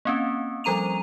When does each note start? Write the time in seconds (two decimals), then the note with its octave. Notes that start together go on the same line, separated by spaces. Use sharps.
0.05 A#3 C4 C#4
0.64 F3 G3 A4 A#5 D#7 F7